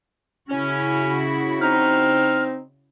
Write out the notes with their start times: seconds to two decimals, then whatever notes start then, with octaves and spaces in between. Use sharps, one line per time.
0.49 C#3 C#4 E4 F#4
1.61 C4 D#4 F6